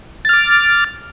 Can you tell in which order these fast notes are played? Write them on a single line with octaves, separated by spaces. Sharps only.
A6 F6 D6